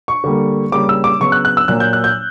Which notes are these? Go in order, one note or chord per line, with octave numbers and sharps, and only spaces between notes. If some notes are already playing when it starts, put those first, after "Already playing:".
C#6
D3 G3 A#3
C#3 G3 A#3 D6
E6
D6
C#3 F#3 B3 C#6
F#6
F#6
E6
A#2 F#3 A#3 F#6
G6
F#6
G6